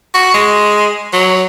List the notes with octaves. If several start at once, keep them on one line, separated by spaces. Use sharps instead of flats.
F#4
G#3
F#3